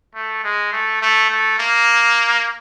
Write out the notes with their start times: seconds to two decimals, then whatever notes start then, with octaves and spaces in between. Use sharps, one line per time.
0.15 A3
0.44 G#3
0.73 A3
1.02 A3
1.30 A3
1.59 A#3